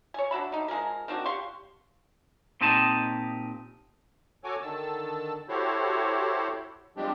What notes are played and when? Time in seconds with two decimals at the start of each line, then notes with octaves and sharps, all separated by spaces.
0.14 C#5 G#5
0.31 D4 F#4 E5 B5
0.52 D3 D#4
0.68 F3 G#3 G#4 A#4
1.08 D#3 C4 D4 F#4
1.25 G4 F5 C6 C#6
2.61 A#2 C4 D#4 G4 D#5 A5
4.44 F#4 A4 C#5 G#5 D6
4.61 D3 D#3 A5 E6
5.49 E4 F#4 G4 A4 C5 C#5
6.97 F3 G3 G#3 C4 D4 G4